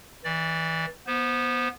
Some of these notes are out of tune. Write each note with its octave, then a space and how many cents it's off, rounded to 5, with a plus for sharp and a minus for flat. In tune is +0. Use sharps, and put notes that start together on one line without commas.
E3 -20 D5 +0
B3 -20 C5 -10